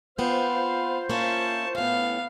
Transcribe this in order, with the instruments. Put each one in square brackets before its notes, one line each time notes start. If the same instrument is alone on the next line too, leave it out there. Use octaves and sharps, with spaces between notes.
[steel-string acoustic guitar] B3 C4 [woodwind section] F4 C5 [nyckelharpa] F5
[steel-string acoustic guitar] A#3 C#4 E4 [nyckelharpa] A5 C#6
[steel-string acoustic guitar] A2 C#4 [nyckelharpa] B3 F5